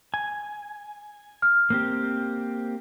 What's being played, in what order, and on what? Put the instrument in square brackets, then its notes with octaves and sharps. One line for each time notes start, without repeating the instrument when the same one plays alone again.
[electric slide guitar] G#5
[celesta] F6
[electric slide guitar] A#3 C4 G4